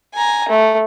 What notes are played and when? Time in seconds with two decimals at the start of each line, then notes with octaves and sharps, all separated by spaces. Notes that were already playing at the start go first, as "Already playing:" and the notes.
0.14 G#5 A#5
0.49 A3